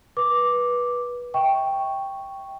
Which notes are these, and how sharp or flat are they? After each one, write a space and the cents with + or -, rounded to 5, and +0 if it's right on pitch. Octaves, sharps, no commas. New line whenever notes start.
B4 -20 D6 +0
E5 -30 G5 +0 C#6 +0